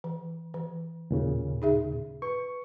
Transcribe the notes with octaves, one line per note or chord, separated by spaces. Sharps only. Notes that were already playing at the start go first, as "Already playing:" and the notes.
E3
E3
D#2 A#2 C#3
D#4 G#4 E5
B4 C#6